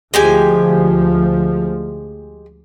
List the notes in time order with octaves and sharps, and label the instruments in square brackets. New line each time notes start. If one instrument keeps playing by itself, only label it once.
[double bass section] D2 F3 [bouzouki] G#3 G4 G#5